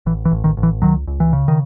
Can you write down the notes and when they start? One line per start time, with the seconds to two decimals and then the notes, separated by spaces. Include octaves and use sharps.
0.06 A1 E3
0.25 E3
0.32 A1
0.44 D#3
0.57 A1
0.63 E3
0.82 C#2 D#3 F#3
1.07 C#2
1.20 E3
1.33 C#3
1.48 D#3